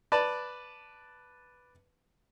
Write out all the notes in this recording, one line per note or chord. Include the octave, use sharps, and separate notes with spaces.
B4 D5 A5